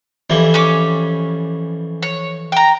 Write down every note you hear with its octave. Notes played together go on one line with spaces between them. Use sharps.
F2 E3 G3
C#4 C#5 D6
C#5
G5 A#5